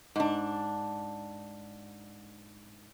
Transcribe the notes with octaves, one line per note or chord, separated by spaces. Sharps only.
G#2 D4